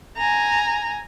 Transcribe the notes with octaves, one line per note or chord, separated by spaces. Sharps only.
G#5 A#5